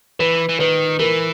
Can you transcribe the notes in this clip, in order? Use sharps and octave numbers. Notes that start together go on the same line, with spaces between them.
E3 B4
E3
D#3 B4
E3 A#4